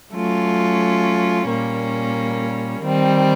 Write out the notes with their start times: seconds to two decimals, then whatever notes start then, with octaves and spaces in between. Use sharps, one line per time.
0.13 F#3 A3 C#4 F4
1.48 A#2 G3 A#3 C#4
2.82 D#3 G3 C4